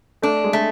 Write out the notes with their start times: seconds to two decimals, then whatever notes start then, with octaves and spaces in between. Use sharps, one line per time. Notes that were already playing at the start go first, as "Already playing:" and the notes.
0.22 A3 D4
0.44 G#3
0.53 A3